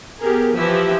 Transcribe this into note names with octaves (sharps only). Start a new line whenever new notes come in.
B3 G4 G#4 A#4
E3 F3 E4 G4 E5